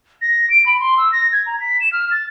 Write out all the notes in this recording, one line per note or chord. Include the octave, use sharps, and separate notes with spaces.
A#6
D7
B5
C6
E6
A#6
G#6
A#5
B6
E7
F6
A6